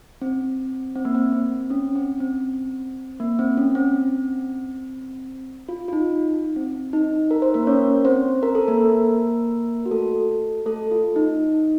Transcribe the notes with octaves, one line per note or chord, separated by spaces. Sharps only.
C4
C4
A#3
C4
C4
C#4
C4
C4
A#3
C4
C#4
C4
F4
F4
D#4
C4
D#4
A#4
C5
A#3 A#4
C#4 C#5
C4 C5
A#4
A4
A#3 A#4
F#4
A3 A4
A3 A4
F4
D#4